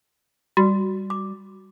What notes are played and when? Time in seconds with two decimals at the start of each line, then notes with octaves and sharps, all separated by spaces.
0.57 G3 F#4
1.10 D6